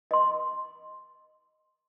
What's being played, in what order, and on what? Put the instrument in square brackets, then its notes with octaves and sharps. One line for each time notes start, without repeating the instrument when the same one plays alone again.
[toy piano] D#5 C6